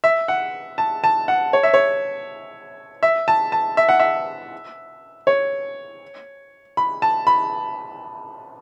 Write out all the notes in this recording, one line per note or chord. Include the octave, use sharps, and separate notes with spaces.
E5
F#5
A5
A5
F#5
C#5
E5
C#5
E5
A5
A5
E5
F#5
E5
C#5
B5
A5
B5